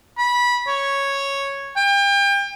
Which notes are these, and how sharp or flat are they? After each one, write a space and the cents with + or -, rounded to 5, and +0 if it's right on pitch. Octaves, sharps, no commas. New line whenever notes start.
B5 -20
C#5 -5
G5 +35